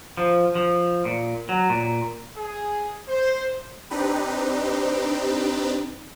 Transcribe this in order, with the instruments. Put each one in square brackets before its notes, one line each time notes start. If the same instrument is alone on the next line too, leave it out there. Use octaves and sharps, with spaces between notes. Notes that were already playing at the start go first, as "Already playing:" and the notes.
[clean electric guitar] F3
F3
A#2
F#3
A#2
[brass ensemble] G#4
C5
[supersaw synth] C4 D4 D#4 G4 B4